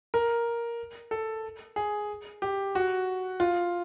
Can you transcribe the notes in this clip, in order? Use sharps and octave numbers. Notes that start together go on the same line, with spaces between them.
A#4
A4
G#4
G4
F#4
F4